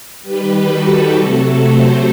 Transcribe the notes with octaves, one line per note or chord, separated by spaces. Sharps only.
D#3 G3 G4 B4
F#4 A4
C3 F#3 A3 F#4 A4
A4 C5